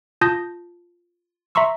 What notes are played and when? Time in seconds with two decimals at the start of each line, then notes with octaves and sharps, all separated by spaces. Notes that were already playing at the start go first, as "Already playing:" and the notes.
0.21 F4 A5 D#6 G6 A#6
1.55 E5 A#5 C6 C#6 E6